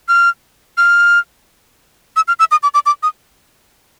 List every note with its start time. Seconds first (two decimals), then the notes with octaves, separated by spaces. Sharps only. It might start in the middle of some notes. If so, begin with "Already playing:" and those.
0.08 F6
0.77 F6
2.16 E6
2.28 F6
2.39 E6
2.51 D#6
2.63 D6
2.74 D6
2.86 D6
3.03 D#6